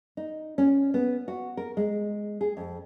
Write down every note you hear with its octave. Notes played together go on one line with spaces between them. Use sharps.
D#4
C#4
B3
F#4
A#4
G#3
G#4
F2